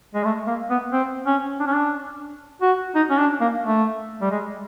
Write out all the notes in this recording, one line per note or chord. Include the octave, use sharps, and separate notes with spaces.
G#3
A3
A#3
B3
C4
C#4
D4
C#4
D4
F#4
D#4
C#4
D4
A#3
A3
G3
G#3